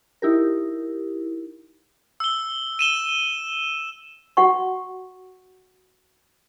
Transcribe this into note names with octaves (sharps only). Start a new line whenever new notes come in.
D#4 E4 G4 A#4
E6 G7
D#7 E7 G7
F#4 F#5 C#6